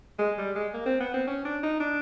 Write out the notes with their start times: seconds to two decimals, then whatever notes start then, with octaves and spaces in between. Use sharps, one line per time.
0.19 G#3
0.38 G3
0.56 G#3
0.74 A#3
0.86 C4
1.00 B3
1.14 C4
1.28 C#4
1.45 D4
1.63 D#4
1.80 D4